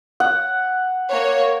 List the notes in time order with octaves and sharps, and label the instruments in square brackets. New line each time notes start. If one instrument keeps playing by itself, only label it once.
[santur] F#5
[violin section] A#3 C#5